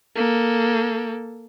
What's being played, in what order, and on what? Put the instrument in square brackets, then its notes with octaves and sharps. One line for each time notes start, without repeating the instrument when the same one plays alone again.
[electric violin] A#3 A4